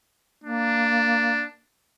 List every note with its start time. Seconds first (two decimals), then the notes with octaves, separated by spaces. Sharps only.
0.44 A#3 D4